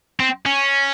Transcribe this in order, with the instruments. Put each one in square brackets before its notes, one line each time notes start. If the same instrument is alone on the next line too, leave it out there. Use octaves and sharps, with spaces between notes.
[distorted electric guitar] C4
C#4